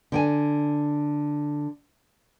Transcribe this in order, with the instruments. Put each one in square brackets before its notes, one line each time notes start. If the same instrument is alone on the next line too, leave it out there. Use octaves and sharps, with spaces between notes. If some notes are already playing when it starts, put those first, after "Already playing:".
[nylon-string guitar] D3 G5 G#5